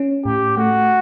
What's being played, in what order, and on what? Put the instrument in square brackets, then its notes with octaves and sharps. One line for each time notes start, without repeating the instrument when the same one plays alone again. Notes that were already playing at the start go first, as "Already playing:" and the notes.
Already playing: [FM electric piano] C#4
[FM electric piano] A2 [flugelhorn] G4
[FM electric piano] A3 [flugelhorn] F#4